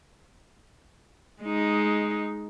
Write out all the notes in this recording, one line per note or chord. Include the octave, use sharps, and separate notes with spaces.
G#3 D#4